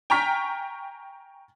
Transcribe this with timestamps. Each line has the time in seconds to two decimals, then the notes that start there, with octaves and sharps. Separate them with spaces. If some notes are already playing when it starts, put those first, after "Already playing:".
0.10 G5 G#5 A#5 C#6 F6 B6